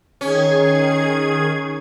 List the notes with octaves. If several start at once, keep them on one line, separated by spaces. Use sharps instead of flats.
D#3 C#4 G#4 G#6